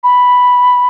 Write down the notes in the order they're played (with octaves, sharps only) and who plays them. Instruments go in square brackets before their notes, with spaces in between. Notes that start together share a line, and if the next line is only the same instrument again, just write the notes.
[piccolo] B5